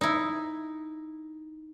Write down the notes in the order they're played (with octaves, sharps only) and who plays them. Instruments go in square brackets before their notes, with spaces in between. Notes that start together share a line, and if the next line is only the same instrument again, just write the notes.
[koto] D#4 E4